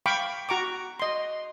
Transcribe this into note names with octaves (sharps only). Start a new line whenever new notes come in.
F5 G5 B5 C#6 D6
F#4 A#5 C#6 D6
D#5 C6